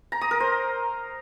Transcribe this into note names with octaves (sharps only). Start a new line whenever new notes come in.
A#5
D#6
A#4
C5